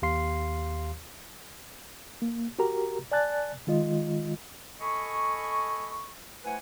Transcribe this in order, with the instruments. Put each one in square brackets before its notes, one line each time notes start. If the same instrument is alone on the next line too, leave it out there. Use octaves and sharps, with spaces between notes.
[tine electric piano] D#2 G4 F5 C6 C7
[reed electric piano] A#3
F#4 G4 A#4 A#5
D5 G#5 A5 F#6 A6
D#3 G#3 F4 D#5
[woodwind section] A4 D#5 G#5 B5 C#6
A3 E4 B4 C5 F#5 G#5